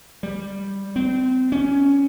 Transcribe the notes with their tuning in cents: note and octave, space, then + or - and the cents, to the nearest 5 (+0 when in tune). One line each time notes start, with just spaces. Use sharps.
G3 +5
C4 -25
C#4 +10